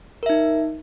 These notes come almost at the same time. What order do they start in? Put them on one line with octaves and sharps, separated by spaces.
A#4 E5 D#4